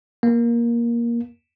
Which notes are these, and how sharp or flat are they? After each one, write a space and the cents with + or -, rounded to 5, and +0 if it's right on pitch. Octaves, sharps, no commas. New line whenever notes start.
A#3 +15